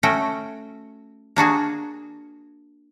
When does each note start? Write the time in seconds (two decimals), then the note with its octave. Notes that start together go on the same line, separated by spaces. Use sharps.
0.03 A3 C#4 F#4 G5
1.36 A#3 D4 F#4 G#4